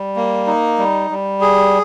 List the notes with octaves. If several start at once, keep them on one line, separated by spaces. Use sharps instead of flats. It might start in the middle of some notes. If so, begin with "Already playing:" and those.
Already playing: G3
A#3
D#4
G3
G3
G#4